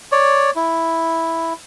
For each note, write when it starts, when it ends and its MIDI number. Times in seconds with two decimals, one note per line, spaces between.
0.12 0.51 73
0.12 0.51 74
0.56 1.53 64